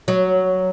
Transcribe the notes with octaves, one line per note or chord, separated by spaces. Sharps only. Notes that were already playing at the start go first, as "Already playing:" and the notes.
F#3